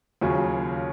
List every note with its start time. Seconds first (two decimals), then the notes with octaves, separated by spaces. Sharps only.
0.21 D#2 C#3 F#3 C#4 F4